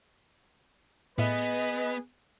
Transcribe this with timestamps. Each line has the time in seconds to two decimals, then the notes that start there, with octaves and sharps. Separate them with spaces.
1.18 A2 B3 G#4 B4 D#5 E5